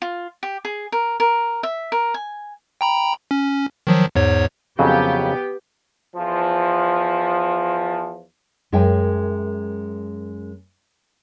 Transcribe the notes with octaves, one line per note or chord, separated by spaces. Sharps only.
F4
G4
G#4
A#4
A#4
E5
A#4
G#5
G5 A#5 B5
C#4
D#3 F3 F#3
E2 G#2 C#5
F2 C#3 F#3 B3 G4
E2 F3
F#2 G#3 A#4 E5 G5 G#5